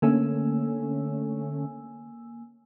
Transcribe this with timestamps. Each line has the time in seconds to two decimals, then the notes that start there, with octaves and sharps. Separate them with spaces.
0.02 D3 A3 A#3 C#4 G#5 E6